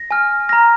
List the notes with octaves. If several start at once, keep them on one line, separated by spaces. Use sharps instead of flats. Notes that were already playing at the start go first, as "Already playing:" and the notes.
Already playing: A#6
G#5 F6
A#5 F6 A#6